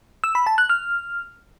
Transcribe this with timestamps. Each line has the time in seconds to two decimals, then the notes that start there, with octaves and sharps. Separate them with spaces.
0.24 E6
0.35 B5
0.47 A5
0.58 F#6
0.69 F6